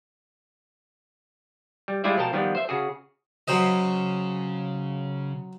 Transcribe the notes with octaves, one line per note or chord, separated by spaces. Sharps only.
G3
G3 G#3 E4 F4 D5 E5
B2 F3 A#4 G5 A5
D#3 F3 G3 B3
C5 E5
C#3 F#4 G#4
C#3 F#3 C5 D#5